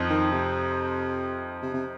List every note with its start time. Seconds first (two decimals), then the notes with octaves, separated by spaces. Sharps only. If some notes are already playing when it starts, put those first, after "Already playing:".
Already playing: F2 F3 C4 D#4
0.10 D#3
0.32 C3
1.62 C3
1.74 C3